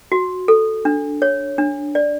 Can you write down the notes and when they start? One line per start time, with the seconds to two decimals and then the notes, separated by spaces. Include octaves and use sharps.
0.12 F#4
0.48 A4
0.85 D4
1.22 C#5
1.58 D4
1.95 D5